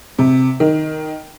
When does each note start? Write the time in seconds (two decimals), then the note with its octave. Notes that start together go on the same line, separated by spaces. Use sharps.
0.18 C3
0.60 D#3